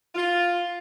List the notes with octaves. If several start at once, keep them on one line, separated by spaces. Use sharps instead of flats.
F4